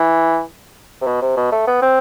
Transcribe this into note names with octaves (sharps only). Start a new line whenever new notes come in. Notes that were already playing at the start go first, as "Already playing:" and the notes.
Already playing: E3
C3
B2
C3
B2
A3
B3
C4